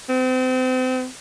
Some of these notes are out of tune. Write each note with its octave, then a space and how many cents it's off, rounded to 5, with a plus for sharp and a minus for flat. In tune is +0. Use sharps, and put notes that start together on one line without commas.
C4 -35